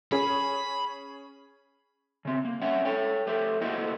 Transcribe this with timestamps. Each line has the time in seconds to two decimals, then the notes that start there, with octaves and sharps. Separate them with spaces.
0.12 C#4 G#4 B5
2.25 C#3 C4
2.45 A#3
2.62 C#4 C#5 E5 F#5
2.85 A4 C#5 G5
3.27 A3 G4 C5
3.61 A3 A#3 E4 F#4 C5 D#5